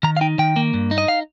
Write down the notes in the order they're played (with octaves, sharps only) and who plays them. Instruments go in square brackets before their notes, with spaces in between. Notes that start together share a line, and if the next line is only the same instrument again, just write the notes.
[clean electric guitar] D#3 A#5
F5
D#4 G5
D#3 G5
A#3
G2
D#4
D#5
F5